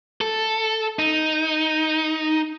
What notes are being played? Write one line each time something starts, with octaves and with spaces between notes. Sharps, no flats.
A4
D#4